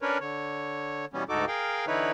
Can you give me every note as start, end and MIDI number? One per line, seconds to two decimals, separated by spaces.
0.02 0.18 61
0.02 0.18 62
0.02 0.18 70
0.02 0.18 71
0.02 0.18 73
0.21 1.05 50
0.21 1.05 73
1.13 1.24 47
1.13 1.24 52
1.13 1.24 55
1.13 1.24 59
1.13 1.24 61
1.29 1.45 38
1.29 1.45 44
1.29 1.45 63
1.29 1.45 66
1.29 1.45 69
1.29 1.45 86
1.48 1.85 68
1.48 1.85 70
1.48 1.85 77
1.48 1.85 79
1.87 2.12 50
1.87 2.12 52
1.87 2.12 63
1.87 2.12 64
1.87 2.12 71
1.87 2.12 73